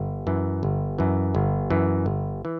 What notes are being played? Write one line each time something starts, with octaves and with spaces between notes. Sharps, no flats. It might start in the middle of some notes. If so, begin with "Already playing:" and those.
Already playing: G1
F#2 E3
G1
F#2 E3
G1
F#2 E3
G1
E3